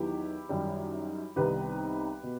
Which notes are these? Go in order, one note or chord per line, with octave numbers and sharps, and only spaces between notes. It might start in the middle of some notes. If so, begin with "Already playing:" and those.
Already playing: E2 D#3 F#3 B3 E4 G4
F#2 D#3 G3
C2 C3 D#3 G3 B3 G4 B4
B2